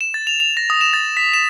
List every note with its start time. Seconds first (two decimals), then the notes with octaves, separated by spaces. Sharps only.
0.01 E7
0.14 A6
0.27 F7
0.40 F7
0.57 A#6
0.70 D#6
0.81 E7
0.93 A6
1.17 B6
1.33 E7